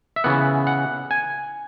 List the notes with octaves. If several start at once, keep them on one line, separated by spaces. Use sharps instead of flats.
E5
C#3 E3 B3 F#5
F#5
G#5